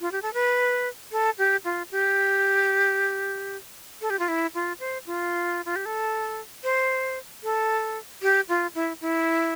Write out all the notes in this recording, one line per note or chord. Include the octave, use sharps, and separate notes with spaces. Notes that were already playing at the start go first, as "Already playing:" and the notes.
F4
G4
A4
B4
A4
G4
F4
G4
A4
G4
F4
E4
F4
C5
F4
F4
G4
A4
C5
A4
G4
F4
E4
E4